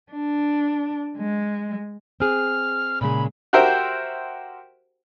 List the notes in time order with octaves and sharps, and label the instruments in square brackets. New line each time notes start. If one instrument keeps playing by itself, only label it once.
[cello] D4
G#3
[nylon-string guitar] C4 G#4 [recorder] F6
[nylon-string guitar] A#2 C#3 G#3 [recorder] B5
[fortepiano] F#4 G4 A#4 C5 E5 G5